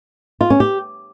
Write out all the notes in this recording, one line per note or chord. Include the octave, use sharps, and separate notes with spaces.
F4
C#4
G4